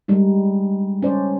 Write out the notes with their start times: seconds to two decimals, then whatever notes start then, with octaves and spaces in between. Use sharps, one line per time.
0.08 G3 G#3 D#4
1.02 C#4 D#4 C5 D5